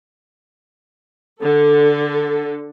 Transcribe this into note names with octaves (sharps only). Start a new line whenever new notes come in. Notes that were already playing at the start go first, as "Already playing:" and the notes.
D3 A4